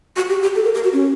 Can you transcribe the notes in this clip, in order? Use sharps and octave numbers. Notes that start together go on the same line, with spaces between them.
F#4
G4
G4
A4
A#4
A#4
F#4
C#4